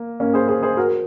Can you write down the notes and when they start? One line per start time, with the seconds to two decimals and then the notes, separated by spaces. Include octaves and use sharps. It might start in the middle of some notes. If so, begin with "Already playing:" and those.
Already playing: A#3
0.20 A#3 C#4
0.34 G#4 C5
0.48 G#4 C5
0.63 G#4 C5
0.77 F#4 A#4